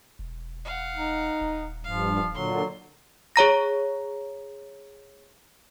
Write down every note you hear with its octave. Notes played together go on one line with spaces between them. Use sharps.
E1
F5 F#5
D#4
D#1
G2 F3 F5
A#2 D3 F#3 C6
G#4 C#5 A#5 A#6